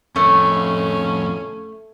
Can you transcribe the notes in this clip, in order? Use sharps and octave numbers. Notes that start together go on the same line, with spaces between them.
F2 A2 A3 C#4